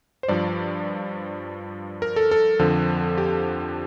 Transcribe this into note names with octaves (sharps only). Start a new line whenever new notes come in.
C5
G2 F3 D5
A#4
A4
A4
F2 D3 F3
G4